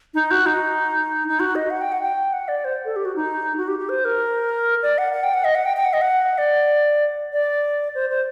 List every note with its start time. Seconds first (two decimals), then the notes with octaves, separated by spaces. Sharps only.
0.14 D#4
0.31 F#4
0.46 D#4
1.28 D#4
1.40 F#4
1.55 D#5
1.70 F#5
1.81 G5
1.92 F#5
2.03 G5
2.33 F#5
2.48 D5
2.65 C5
2.85 A4
2.96 G4
3.05 F#4
3.16 D#4
3.58 F#4
3.68 G4
3.79 G4
3.89 C5
4.05 A#4
4.83 D5
4.98 F#5
5.13 F#5
5.23 G5
5.34 F#5
5.44 D#5
5.55 F#5
5.65 G5
5.77 G5
5.85 F#5
5.93 D#5
6.02 F#5
6.38 D5
7.32 D5
7.95 C5
8.10 C5